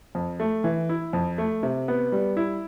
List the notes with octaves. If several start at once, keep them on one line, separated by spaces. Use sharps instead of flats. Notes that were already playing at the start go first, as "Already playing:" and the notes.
F2
A3
E3
E4
F2
A3
C3
B3
G3
E4